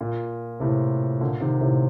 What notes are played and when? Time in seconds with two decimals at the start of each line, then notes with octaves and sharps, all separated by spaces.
0.01 A#2
0.60 A2 C3
1.21 A#2 D3
1.41 C3 D#3
1.61 A2 C3